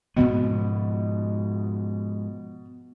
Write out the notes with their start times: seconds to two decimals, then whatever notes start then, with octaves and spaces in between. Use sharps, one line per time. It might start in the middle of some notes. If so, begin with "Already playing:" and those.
0.16 G#2 B2 F3 B3